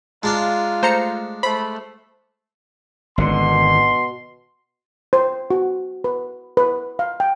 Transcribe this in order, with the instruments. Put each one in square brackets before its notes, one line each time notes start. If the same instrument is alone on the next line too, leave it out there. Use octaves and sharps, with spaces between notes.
[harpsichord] G#3 D4 F5 [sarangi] F4 [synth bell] A5 A#5
[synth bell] A3 [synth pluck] C5 A#5 C#7
[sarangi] A3 [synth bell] C5 [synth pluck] B5
[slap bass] G#1 D3 [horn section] B2 C6
[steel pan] C5
F#4
B4
B4
F5
G5